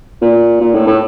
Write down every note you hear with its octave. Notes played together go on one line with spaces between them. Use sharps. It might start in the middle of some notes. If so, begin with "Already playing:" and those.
A#2
A#2
A2
A2